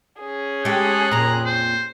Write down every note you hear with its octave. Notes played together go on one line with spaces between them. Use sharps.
C#4 G#4
G#3 G4 A4 F#6
F2 A#2 A#5
C5